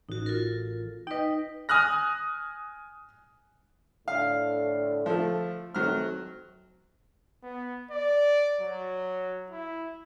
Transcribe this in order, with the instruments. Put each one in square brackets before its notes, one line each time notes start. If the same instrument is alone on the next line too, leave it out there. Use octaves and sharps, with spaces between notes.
[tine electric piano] A1 [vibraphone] D#4 F#4
[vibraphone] F4 A4 A#4
[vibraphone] D#4 B4 [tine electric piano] D#5 G5
[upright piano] G#5 D#6 F6 F#6 A#6
[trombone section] A2 D3 [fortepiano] F5
[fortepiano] F3 A3
[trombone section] D#3 A3 C4 [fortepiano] F#3 F6
[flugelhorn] B3
D5
F#3
E4